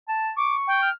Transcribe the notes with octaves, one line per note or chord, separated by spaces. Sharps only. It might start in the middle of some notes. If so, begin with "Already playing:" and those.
A5
C#6 D6
G5
F6